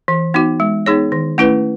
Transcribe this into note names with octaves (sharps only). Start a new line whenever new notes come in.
E3
B3 D#4 F#4
G#3
B3 D#4 G#4 C#5
D#3
A3 C#4 E4 B4